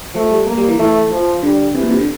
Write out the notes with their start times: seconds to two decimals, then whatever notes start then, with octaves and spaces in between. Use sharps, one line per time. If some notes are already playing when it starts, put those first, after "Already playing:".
0.15 F3 A3
0.31 G3
0.47 A#3
0.57 G3
0.68 E3
0.79 E3 A3
1.11 F3
1.43 D3 G3
1.75 C3 E3
1.83 A#2
1.90 C3
1.99 D3